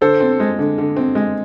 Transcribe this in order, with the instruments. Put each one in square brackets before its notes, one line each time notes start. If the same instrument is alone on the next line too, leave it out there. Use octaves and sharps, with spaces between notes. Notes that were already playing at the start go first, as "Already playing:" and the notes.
[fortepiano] D3 [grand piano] A4 C5
[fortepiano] C4
G#3
D3
D3
C4
G#3